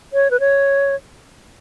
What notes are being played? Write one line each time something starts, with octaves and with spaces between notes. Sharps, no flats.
C#5
B4
C#5